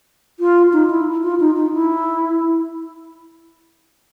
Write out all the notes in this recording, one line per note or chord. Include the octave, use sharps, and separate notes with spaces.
F4
D#4
E4
F4
D#4
D#4
E4